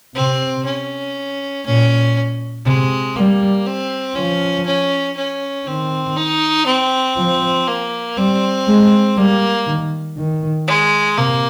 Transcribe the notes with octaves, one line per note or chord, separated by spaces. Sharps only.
C3 C4
C#4
A#2 C#4
C3 G#3
G3 A#3
C4
F3 C#4
C#4
C#4
D#3 C4
D#4
C4
F3
A#3
G3 C4
G#3
G3 A#3
D#3
D#3
G#3
C3 A#3